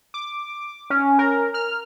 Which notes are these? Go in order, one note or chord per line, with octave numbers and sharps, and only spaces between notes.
D6
C#4
A#4
F6